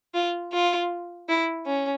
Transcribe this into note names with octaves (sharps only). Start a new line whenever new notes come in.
F4
F4
E4
C#4